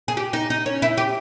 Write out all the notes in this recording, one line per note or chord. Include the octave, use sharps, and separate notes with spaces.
G#4
G4
D#4
D#4
C#4
E4
G4